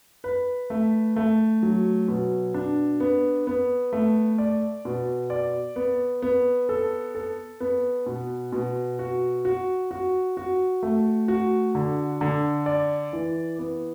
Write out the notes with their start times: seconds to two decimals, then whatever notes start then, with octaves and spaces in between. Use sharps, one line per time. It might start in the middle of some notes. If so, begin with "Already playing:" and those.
0.24 B4
0.70 A3
1.16 A3
1.63 F#3
2.08 B2
2.54 D4
3.00 B3
3.47 B3
3.93 A3
4.38 D5
4.85 B2
5.30 D5
5.76 B3
6.22 B3
6.69 A4
7.15 A4
7.60 B3
8.06 B2
8.52 B2
8.99 F#4
9.45 F#4
9.91 F#4
10.37 F#4
10.83 A3
11.28 F#4
11.75 D3
12.21 D3
12.66 D5
13.13 E3
13.59 B3